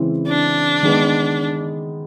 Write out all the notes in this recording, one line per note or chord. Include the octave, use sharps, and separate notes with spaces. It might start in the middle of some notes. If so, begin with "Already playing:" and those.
Already playing: C#3 E3 G#3 C4 E4
D4
D#3 G#3 B3